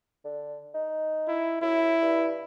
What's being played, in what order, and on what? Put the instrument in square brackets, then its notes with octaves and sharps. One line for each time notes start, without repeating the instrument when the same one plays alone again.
[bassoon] D3
D#4
[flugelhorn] E4
[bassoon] F#2 [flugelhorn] E4
[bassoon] G2